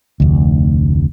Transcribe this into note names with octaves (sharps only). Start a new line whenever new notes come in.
F1 D2